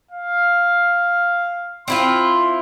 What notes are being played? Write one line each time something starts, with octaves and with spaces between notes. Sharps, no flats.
F5
C4 E4 F4 C6